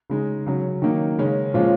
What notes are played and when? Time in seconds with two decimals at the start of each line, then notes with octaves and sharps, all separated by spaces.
0.10 C#3 G#3 D#4
0.46 C#3 F#3 C#4
0.82 D#3 F#3 A#3 D#4
1.19 C#3 G#3 C#4
1.54 A#2 F3 G#3 C#4 F4